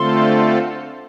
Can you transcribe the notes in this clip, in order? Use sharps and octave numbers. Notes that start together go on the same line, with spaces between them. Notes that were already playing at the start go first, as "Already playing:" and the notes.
Already playing: D3 A3 C4 F4 A4 C6